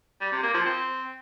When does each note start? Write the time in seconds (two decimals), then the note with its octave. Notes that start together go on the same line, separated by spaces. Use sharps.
0.21 G3
0.32 C3
0.43 A#3
0.54 F3
0.65 C4